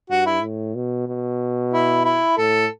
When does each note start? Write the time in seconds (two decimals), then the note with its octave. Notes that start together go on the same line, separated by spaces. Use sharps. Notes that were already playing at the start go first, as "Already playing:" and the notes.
0.10 G2 F#4
0.26 E4
0.42 A2
0.75 B2
1.07 B2
1.73 E4
2.05 E4
2.37 A2 A4